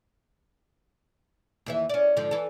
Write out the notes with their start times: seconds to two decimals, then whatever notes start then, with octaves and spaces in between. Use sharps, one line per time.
1.66 D#2 E3 E5
1.89 C#4 D5
2.16 G#2 D3 F3
2.31 E3 A4